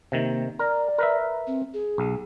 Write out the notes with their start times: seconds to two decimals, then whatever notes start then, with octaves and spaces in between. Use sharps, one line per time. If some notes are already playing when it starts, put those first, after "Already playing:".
0.12 C3 D#3 A#3
0.59 A#4 D5
0.98 A#4 B4 E5
1.47 C4
1.74 G#4
1.98 B1